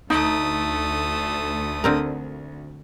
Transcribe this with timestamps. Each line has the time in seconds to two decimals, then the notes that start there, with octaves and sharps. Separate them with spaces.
0.10 D2 A3 D#4 D#6
1.84 D3 C4 A#4